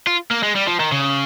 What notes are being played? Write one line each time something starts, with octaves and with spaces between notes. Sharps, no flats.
F4
A#3
G#3
G3
F3
D#3
C#3